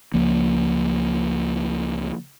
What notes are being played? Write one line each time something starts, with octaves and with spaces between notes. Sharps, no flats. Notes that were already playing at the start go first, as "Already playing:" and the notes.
C#2 F3 A#3